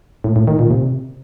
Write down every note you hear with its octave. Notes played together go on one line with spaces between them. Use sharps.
A2
A2
D#3
A#2
C3